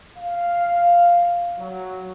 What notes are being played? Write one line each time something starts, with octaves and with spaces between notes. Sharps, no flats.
F5
F#3